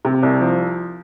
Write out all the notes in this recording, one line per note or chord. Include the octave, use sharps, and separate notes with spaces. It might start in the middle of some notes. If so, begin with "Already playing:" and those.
C3
C2
F3